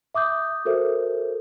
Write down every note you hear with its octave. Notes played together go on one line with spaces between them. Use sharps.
E5 D6 D#6 G6
F#4 A4 A#4 C5 E5